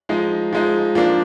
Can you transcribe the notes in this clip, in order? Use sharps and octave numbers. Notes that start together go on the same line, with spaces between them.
F3 G#3 D#4
F3 G#3 D#4
F3 A#3 D4